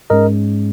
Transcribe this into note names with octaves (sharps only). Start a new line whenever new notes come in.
G#2 G#3 C#4 A#4 D#5